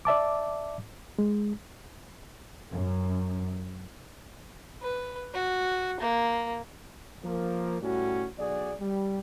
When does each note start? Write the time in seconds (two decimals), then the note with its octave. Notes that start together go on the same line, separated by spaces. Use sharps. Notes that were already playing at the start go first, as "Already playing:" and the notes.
0.05 D5 E5 A5 D6
1.19 G#3
2.71 F#2
4.82 B4
5.34 F#4
6.00 A#3
7.24 F3 A#3 A#4
7.82 A2 G3 C#4 F#4
8.38 B1 F#4 G#4 D5
8.80 G3